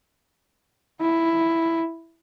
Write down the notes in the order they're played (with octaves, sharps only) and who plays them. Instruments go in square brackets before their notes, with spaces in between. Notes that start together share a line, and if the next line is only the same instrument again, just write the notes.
[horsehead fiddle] E4